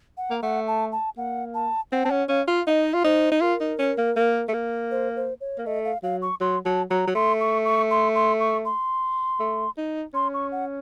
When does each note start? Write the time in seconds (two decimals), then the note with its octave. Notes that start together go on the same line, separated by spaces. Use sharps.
0.17 F#5
0.31 A#3
0.43 A3 F#5
0.68 A5
0.92 A5
1.17 A#3 F#5
1.55 A5
1.92 C4 F#5
2.05 C4 A5
2.11 C#4 F#5
2.29 C#4 F5
2.48 F4 F5
2.66 D#4 D#5 F5
2.94 F4
3.04 D#4 C5
3.32 D#4
3.41 F4 A#4
3.61 D#4
3.79 C#4
3.98 A#3
4.16 A#3
4.49 A3
4.54 A#3
4.91 C5
5.16 C5
5.41 C#5
5.58 A#3
5.66 A3 D#5
5.85 F5
6.03 F#3 F5
6.22 C#6
6.41 F#3 C6
6.65 F#3 A5
6.90 F#3 A#5
7.07 F#3
7.15 A3 C6
7.41 C#6
7.65 C#6
7.91 C6
8.15 C6
8.40 C#6
8.65 C6
9.40 A3
9.78 D#4
10.14 C#4 C6
10.34 C#6
10.52 F#5